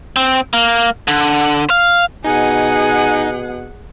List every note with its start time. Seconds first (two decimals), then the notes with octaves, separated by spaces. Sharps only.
0.16 C4
0.53 A#3
1.08 D3
1.70 F5
2.24 B2 D#4 G#4 F#5 G#5